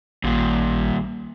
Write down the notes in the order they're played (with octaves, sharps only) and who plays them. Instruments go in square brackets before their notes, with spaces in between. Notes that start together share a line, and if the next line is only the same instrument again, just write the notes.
[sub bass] A1 [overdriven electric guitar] D#2 A#2